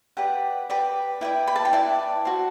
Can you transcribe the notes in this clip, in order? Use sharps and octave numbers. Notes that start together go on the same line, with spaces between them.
G4 B4 D5 F#5
G4 B4 D5
E4 B4 D5 G5
B5
A5
G5
E4 B4 D5 A5
F#4 C5